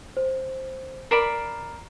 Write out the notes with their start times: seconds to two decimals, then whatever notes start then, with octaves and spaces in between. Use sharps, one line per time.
0.17 C5
1.11 A#4 D5 B5 C7 D7 E7